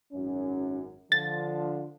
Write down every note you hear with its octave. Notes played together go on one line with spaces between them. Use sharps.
G#1 F#2 C#4
D3 F3 D4 F4 A6